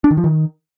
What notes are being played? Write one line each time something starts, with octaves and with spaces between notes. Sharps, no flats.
D4
D#3
F3
D#3